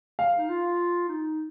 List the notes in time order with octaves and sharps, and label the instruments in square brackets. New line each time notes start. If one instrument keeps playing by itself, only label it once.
[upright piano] F5
[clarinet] D#4
F4
D#4